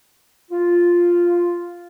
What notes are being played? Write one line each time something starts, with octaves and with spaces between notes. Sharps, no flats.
F4